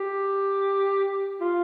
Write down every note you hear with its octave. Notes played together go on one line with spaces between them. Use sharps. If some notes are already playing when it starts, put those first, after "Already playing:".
Already playing: G4
F4